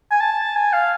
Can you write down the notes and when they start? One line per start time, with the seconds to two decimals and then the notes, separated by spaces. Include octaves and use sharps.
0.11 G#5
0.21 A5
0.56 G#5
0.73 F5